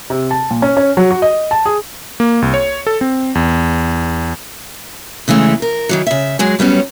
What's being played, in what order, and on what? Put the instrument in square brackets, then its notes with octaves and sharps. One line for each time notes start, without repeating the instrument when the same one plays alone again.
[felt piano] C3
A5
A#2
C#4
C#4
F#3
F#4
D#5
A5
G#4
[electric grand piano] A#3
C2
C#5
A4
C4
E2
[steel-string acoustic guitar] C#3 E3 G#3 A3
A#4
D#3 E3 F#3
C#3 E5
F#3 G#3 G#4
F#3 G3 B3 C#4